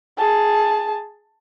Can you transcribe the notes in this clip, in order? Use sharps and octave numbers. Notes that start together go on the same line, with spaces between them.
G#4 A5